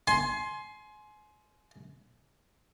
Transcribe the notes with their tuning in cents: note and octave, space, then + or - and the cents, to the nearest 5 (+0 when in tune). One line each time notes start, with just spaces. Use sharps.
G#5 +30 C6 +5